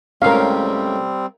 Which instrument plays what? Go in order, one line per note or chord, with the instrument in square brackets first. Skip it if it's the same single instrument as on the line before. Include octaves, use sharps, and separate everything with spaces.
[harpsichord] C#2 A2 [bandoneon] G3 C4 [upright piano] C#4 [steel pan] A#4 F5